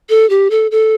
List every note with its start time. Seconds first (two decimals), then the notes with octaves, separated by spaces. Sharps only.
0.09 A4
0.30 G4
0.51 A4
0.71 A4